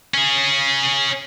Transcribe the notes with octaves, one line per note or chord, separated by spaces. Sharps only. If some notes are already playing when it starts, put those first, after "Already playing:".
C#4 G#4